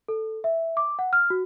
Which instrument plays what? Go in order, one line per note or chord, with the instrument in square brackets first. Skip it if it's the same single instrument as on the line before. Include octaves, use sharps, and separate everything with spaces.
[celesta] A4
E5
D6
F#5
F6
F#4